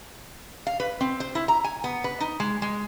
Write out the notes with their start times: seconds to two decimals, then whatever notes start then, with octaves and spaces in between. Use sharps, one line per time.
0.67 F5
0.80 B4
1.01 C4
1.20 C5
1.35 E4
1.48 A#5
1.64 G#5
1.84 B3
2.04 B4
2.20 D#4
2.40 G#3
2.62 G#3